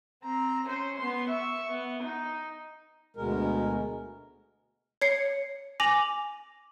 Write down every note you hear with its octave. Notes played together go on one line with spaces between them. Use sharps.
C4 A#5
C#4 C5
B3 C6
E5 C#6
B3
D#4
D2 B2 G#3 A#4
C#5 C7 C#7
G#5 D6 A#6 F7 F#7